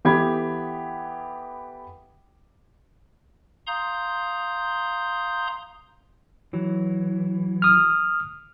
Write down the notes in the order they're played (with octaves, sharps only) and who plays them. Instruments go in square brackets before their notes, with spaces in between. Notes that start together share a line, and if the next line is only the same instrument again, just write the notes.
[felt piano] E3 B3 G4 A4 B5 G#6
[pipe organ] F5 A#5 C6 D#6 G6
[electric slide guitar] E3 F#3
[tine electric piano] D#6 F6